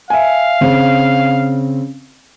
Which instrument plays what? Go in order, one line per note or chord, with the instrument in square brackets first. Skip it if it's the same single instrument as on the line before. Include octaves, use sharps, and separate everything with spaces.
[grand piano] E5 G#5 [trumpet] F5
[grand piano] C#3 C4